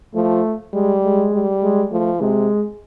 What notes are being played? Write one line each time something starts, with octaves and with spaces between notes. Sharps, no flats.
F3 A3
G3 G#3
G#3
G3
G#3
F3 A3
C3 G#3